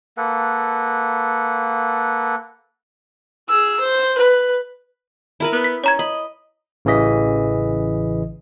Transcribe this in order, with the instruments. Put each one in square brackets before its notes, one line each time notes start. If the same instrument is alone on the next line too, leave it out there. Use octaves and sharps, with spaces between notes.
[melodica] A#3 A4 B4 F#5
[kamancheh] G#4 E6
C5
B4
[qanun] E4 A#4 B4
[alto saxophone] B3
[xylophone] B6
[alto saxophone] C#4 [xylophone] C#5 A#5 G#6
[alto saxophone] D#5 [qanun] B5
[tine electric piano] A1 C#3 E3 D#5 B6